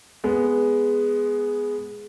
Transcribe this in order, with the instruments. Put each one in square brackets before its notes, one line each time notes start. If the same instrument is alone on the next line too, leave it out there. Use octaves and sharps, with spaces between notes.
[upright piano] G#3 B3